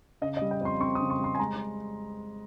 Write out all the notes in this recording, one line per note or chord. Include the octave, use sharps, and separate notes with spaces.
C#3 D#5
D#5
G3
G5
F2 C6
C4 C#6
D#6
C#3
C#6
G3 C6
G#5
G#3 A#5